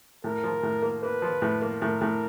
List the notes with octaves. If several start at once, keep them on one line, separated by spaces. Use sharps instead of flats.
A2 A#4
F3
A2
A#3
A#3 B4
F3
A2
A#3
A2 A#4
A2